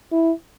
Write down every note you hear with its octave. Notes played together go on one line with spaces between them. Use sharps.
E4